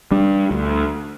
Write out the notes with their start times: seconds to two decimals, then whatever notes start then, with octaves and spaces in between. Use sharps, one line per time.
0.11 G3 D4
0.51 D2